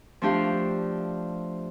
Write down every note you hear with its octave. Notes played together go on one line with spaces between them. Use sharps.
F3 A3 D4 G4 F5